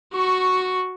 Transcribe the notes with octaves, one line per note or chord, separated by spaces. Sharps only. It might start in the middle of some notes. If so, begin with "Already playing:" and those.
F#4 C#6